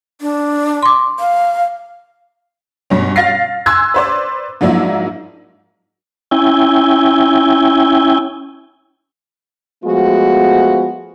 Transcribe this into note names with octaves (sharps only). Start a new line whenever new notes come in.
D4
C6 D6
F5
G2 B2 C#4
F5 A6 A#6 C7
G#5 C6 E6 F#6 G#6
B4 C5 D5
G#2 F3 F#3 A#3 D4 E4
C#4 E4 G5 G#5
F3 G#3 A3 B3 F#4